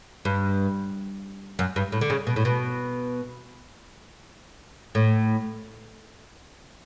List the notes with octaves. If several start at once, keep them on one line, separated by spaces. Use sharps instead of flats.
G2
F#2
G2
A2
D3
C#3
B2
A2
B2
A2